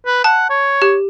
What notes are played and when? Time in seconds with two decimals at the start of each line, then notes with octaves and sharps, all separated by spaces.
0.06 B4
0.24 F#5 A5
0.50 C#5
0.82 G4